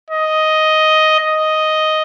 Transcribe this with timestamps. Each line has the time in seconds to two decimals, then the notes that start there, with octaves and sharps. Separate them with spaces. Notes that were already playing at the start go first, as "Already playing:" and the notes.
0.10 D#5
1.20 D#5